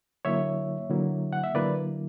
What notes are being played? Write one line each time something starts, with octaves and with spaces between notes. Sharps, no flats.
D3 F#3 A#3 E4 C#5 E5
D3 F#3 A#3 E4
F#5
E5
D3 F#3 A#3 E4 B4 D5